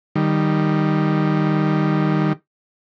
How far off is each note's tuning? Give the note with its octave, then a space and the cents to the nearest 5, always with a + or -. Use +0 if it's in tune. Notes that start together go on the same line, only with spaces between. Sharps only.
D#3 -10 G3 +0